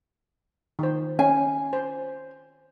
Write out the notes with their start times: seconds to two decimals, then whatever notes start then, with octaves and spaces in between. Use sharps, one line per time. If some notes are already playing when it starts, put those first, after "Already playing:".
0.79 D#3 C5
1.19 C#4 G#5
1.73 C5